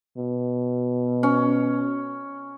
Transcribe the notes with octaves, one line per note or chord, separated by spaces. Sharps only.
B2
C#4